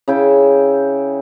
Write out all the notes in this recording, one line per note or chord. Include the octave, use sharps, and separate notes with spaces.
C#3 E4 G5